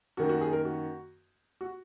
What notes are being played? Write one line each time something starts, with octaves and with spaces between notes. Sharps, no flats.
F#2 D#3 A#3 F#4
F#4
G#4
A#4
F#4
F#4